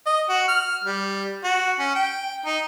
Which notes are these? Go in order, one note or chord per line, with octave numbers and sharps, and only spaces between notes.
D#5
F#4
F6
G3
F#4
C#4
G5
D#4